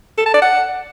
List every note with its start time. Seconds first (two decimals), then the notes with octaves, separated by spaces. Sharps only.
0.18 A4
0.26 A5
0.34 D5
0.42 F#5